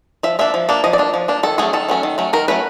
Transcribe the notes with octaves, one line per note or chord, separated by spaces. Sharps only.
F3 E5
A#3 D4 E5
F3
A#3 D4
F3 D#5
D5
A#3 D4
F3
A#3 D4
D#3 A4
F#3 A3 C#4 G#4
D#3 A4
F#3 A3 C#4
D#3
F#3 A3 C#4
D#3 A#4
F#3 A3 C#4 B4